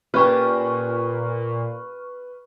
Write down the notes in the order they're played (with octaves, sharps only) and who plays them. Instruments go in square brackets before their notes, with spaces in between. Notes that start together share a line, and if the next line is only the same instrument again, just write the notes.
[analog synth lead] A#2 [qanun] C#4 G4 A5 [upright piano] B4 [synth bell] C#6 F6